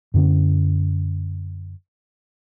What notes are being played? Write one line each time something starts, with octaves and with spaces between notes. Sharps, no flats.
F#2 D3 C#4